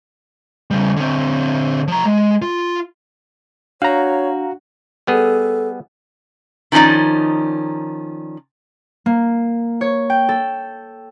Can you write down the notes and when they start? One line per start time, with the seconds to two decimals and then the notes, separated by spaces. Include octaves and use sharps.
0.71 C#3 G3
0.96 D3 C4
1.88 F3 A#5
2.05 G#3
2.42 F4
3.82 D4 F#4 C#5 F5 A#5
5.07 G3 B3 G#4 A4
6.72 D#3 F3 C#4 D#4 D5
9.06 A#3
9.81 C#5
10.10 G5
10.29 A4